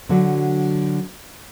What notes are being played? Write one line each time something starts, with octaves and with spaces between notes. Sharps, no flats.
D3 F#3 D4 F#4